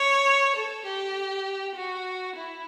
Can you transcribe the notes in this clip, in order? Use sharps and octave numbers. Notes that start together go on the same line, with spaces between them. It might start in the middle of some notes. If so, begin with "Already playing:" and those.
Already playing: C#5
A4
G4
F#4
E4